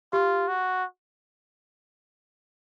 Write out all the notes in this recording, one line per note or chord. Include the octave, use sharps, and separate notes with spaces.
F4 G4
F#4